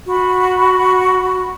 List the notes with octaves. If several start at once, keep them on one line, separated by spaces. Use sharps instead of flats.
F#4 B5